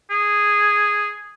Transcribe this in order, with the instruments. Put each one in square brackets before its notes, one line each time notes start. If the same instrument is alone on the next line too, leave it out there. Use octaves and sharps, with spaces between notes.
[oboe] G#4